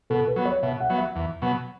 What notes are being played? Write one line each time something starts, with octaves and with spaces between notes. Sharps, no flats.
B2 A4
B4
F#3 B3
C#5
B2 E5
F#5
F#3 B3
E5
E2
B2 F#3 B3